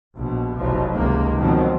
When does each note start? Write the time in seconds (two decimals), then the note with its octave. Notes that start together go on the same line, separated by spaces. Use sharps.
0.17 A#1 B2
0.58 F1 B1 E2 F3 F#3
0.93 C#2 C3 D#3 G#3 A#3
1.36 F2 B2 D#3 F3 F#3 C4